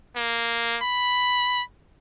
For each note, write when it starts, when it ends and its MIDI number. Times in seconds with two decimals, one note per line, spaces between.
0.16 0.77 58
0.82 1.62 83